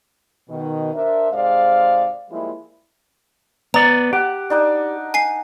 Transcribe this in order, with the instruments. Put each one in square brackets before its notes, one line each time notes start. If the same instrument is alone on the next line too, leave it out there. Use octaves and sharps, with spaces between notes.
[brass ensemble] B2 D#3
D4 A#4 C5 E5
G#2 C3 G#3 C5 D5 F5
F3 G3 G#3 A#3 E4
[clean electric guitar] B3 D5 [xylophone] A#5
[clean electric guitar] G4 [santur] F#5
[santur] D4 D#4 A5
[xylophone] G#5 C7